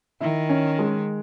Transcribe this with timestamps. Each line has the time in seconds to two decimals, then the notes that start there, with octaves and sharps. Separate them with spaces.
0.20 D#3 E4
0.49 C#4
0.79 G#3